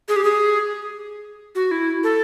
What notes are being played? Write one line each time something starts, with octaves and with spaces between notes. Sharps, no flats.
G#4
G4
G#4
F#4
E4
A4